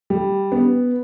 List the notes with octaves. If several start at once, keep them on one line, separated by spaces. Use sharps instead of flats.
G3
B3